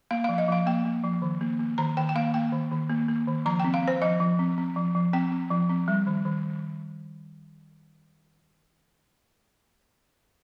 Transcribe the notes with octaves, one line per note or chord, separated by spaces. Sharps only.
A#3 F5
F3 F5
D#5
F3 F5
A#3 G5
A#3
F3
D#3
A#3
A#3
D#3 A#5
D#3 G5
G5
A#3 F5
A#3 G5
D#3
D#3
A#3
A#3
D#3
F3 A#5
C4 G5
F5
C4 C5
F3 D#5
F3
C4
C4
F3
F3
C4 G5
C4
F3
C4
G3
D#3
D#3